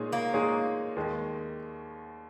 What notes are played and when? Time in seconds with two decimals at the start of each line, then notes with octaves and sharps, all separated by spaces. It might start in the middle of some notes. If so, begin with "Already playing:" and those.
Already playing: A#2 G#3 D#4 G#4 C#5
0.13 A#3
0.33 A#2 G#3 D#4 G#4 C#5
0.96 D#2 D#3 G#3